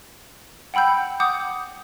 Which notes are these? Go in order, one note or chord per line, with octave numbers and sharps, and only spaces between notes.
F#5 G5 B5 E6 G6
F#5 D6 D#6 G6